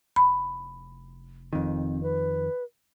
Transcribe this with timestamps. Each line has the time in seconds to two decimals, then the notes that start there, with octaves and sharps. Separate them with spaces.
0.16 F1 B5
1.53 F2 D#3 C4
2.03 B4